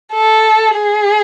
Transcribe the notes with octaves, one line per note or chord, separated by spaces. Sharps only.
A4
G#4